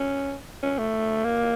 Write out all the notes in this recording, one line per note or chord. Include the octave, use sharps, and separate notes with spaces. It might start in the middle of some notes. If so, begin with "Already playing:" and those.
Already playing: C#4
C#4
A3
A#3